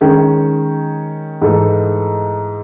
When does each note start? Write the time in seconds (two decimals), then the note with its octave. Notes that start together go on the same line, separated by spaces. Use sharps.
0.01 D#3 G#3 C#4
1.42 G#2 E3 A3 D#4 A4